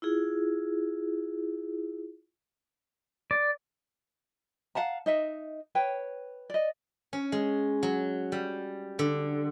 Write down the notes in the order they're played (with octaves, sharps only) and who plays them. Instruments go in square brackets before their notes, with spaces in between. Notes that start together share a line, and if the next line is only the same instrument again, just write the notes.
[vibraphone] E4 F4 G#4
[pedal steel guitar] D5
[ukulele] F5 F#5 A5 A#5
D#4 D#5 E5
B4 C#5 G5
D5 D#5
[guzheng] C#4
G#3
F#3
G3
D3